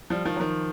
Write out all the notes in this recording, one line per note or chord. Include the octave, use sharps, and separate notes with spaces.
F3 G3
D#3 F3
F#3
D#3 F3